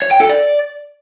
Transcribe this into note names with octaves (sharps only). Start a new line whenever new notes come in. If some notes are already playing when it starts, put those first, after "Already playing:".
C#5
G5
A4
D5